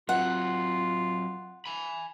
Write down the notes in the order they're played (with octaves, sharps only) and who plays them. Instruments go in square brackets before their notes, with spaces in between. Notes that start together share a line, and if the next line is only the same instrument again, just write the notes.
[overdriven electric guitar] F#3 C4 [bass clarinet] F4 [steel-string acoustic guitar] F#5
[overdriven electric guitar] G#5 B5